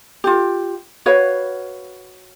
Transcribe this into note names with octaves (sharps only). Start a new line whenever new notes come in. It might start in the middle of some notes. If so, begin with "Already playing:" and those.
F4 G4
F#4 B4 C#5 F5